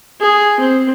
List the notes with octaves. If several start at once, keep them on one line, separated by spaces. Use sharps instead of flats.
G#4
C4